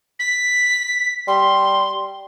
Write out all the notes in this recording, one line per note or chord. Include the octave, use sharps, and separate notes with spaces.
B6
G3 C6